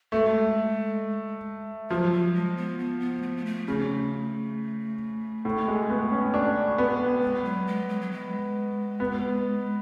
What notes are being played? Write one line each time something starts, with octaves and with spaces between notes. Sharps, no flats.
G#3 A3
F3 F#3
F#3
G#3
B3
B3
B3
A3
B3
A3
C#3 A3
A2
G#3
B3
C#4
D4
B3
G#3
F#3
G#3
F#3
F#3
G#3
B3